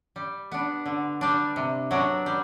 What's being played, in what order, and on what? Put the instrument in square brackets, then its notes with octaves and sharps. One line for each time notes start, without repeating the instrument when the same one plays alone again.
[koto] G3
B3 D4
D3
G3 D4
C3
F#3 B3 D4
G3